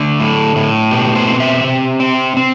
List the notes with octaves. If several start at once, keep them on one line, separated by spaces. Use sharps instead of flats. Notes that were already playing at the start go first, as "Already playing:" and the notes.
Already playing: D3 A3
A2
A2
B2 G4
C5
C4
E5
C3
C4
C4